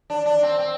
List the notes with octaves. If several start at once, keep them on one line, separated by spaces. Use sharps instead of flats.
D4
D4
C4
C4